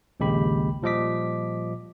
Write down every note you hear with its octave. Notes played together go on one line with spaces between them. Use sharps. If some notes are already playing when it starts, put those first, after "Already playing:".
A#1 D#2 C#3 G#3 G4 B5
A#2 F3 G3 D#5 D6 B6